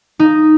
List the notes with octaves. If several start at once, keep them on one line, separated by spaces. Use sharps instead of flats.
D#4